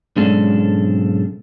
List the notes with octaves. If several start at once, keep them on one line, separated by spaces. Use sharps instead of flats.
B1 G#2 G#3 C#4 D4 A4